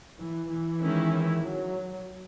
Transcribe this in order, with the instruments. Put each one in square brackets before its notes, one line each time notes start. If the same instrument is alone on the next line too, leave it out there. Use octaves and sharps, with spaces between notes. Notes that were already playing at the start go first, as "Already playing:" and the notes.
[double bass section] E3
E3
[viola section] D#3 G#3 C#4 E4
[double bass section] F#3